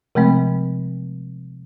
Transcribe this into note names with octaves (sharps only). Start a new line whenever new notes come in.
C3 F3 G#3 A3 C4